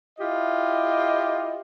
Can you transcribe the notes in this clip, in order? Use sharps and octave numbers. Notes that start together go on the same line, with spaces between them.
E4 F4 G4 D#5